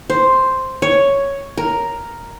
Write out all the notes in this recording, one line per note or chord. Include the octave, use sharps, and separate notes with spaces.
C5
C#5
A#4